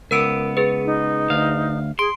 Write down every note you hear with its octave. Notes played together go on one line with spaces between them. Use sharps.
C#2 B3 A#4 E6 D7
G#4 B4
D#4
D2 F5
G#4 C6 D7